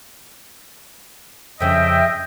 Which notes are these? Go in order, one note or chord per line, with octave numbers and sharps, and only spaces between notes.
F2 C#3 D#5 E5 G5